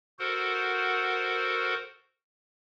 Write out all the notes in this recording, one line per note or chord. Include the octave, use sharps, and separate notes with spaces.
F#4 A4 A#4 C5 F#5